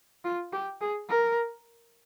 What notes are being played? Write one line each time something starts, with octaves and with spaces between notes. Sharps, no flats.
F4
G4
G#4
A#4